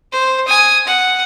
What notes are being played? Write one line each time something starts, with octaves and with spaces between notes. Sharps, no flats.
C5
G#5 D#6
F#5